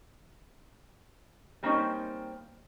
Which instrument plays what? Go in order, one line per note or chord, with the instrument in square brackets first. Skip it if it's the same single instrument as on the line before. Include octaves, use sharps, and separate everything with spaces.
[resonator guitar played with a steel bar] G3 A#3 C4 C#4 D#4 C5